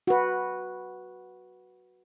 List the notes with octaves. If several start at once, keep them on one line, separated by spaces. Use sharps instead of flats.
F#4 B4